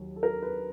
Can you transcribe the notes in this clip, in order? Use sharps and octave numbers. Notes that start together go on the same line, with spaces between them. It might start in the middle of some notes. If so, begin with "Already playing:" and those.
Already playing: D#2 D#3 F#3
A4
A#4
B4